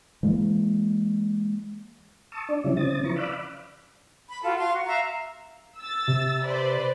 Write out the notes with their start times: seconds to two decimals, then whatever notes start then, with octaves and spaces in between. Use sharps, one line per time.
0.23 E3 G#3 A#3
2.32 A5 C#6 D#6 E6
2.49 D4 D5
2.64 C#3 F3 G3 C#4 E4
2.77 C#3 C4 C#4 D#6 A6
3.03 F3 E4 B4 A#5 C#6
3.16 D5 F5 B5 D6 E6 F#6
4.29 B5
4.43 F4 F#4 A4
4.58 F5 C6
4.72 F#4
4.86 E5 F5 A#5
5.78 E6 A6
6.08 C3
6.44 B4 C5 D5